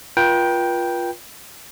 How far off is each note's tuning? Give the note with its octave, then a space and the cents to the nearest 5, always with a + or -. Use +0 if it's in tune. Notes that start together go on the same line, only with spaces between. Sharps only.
F4 +0 B4 -45 G5 +0